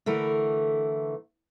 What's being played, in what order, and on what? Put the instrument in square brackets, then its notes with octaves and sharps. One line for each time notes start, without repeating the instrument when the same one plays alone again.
[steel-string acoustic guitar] D3 E3 A3 A#4